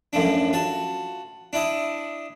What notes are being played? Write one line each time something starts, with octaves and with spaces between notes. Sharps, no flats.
F#2 A2 F3 D4
F4 F#4 A5
D4 E4 D#5